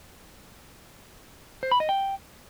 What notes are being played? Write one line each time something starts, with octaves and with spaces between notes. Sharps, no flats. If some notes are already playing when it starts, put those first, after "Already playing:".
C5
B5
D#5
G5